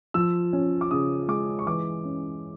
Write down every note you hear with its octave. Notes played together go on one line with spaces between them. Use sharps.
F3 E6
C#4
D6
C#3 D#6
G#3 D6
C#6
E3 D6
C#4